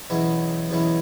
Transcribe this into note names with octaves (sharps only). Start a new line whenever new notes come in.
E2 B2 F#3 C#4 E4
E2 B2 F#3 C#4 E4